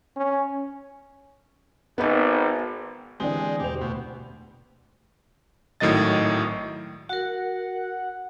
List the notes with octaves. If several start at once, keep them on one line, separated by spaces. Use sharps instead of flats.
C#4
G#1 B3 D#4
D3 E3 G#3 C4 D4 G4 G7
E1 G4 C5 G5 F7
D2 B2
G#1 A2 D#3 F#3 D#5 A6
F#4 A#4 F#5